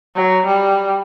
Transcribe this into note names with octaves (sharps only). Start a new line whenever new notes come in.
F#3
G3